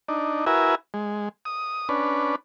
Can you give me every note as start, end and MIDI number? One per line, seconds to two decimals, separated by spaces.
0.08 0.45 62
0.08 0.45 63
0.46 0.75 64
0.46 0.75 66
0.46 0.75 70
0.46 0.75 71
0.46 0.75 76
0.46 0.75 80
0.94 1.29 56
1.45 1.88 87
1.89 2.36 61
1.89 2.36 62
1.89 2.36 71